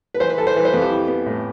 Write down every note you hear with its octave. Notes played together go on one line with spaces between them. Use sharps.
B4
E3 C5
B4
E3 A4
C5
E3 B4
C5
F2 B4
G4
E4
B3
A2